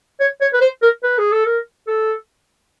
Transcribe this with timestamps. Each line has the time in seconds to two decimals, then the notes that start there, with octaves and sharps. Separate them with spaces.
0.20 C#5
0.41 C#5
0.53 B4
0.61 C5
0.82 A#4
1.03 B4
1.18 G#4
1.32 A4
1.46 A#4
1.87 A4